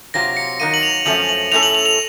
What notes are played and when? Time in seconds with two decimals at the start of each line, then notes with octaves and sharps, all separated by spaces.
0.14 C3 F#3 C4 F4 A#6
0.37 C#7
0.60 D#3 F#3 A#3 D#7
0.74 F#7
0.83 F7
1.05 F#2 F3 A3 C#4 F#7
1.29 F#7
1.52 A2 A3 C#4 A4 F7
1.63 F#7
1.75 F7
1.86 F7